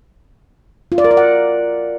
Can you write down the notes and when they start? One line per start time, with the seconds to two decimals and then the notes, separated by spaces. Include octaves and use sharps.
0.92 F4
0.98 D5
1.04 A#4
1.11 D5
1.17 F#5